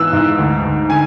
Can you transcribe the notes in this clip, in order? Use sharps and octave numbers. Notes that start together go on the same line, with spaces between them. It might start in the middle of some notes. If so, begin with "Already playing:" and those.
Already playing: G#2 E3 B3 E6 F#6
G#2
D2
D2
D3 G#5